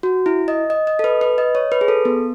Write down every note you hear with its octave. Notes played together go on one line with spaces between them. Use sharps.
F#4
E4
D#5
D#5
D#5
A4
B4
B4
D#5
C#5
B4
G#4
A4
B3